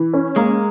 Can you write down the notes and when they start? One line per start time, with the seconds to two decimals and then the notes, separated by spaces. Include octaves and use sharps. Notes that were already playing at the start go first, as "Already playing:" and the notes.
Already playing: E3
0.14 C#4
0.36 G#3 A#3